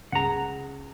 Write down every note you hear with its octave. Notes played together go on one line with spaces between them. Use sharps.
C#2 G#4 F#5 A#5